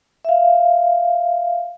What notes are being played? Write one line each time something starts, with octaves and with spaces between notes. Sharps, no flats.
E5 F5